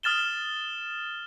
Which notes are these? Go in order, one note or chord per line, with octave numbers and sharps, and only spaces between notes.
D#6 F6 A6 E7 G7